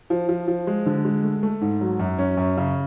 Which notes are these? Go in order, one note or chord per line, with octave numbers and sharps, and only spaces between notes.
F3
F3
F3
G#3
D3
G#3
A3
A3
G#2
F#3
F#2
C#4
F#2
C#3